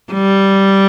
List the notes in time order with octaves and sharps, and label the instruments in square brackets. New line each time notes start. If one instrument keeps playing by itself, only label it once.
[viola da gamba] G3